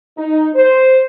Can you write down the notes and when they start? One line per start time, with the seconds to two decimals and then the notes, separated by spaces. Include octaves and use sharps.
0.18 D#4
0.55 C5